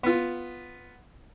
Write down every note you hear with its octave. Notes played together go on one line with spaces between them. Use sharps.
B3 F4